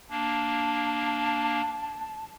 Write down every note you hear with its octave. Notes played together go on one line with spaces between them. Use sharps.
A#3 D4 A5